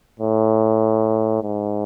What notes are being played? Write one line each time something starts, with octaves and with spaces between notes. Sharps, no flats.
A2
G#2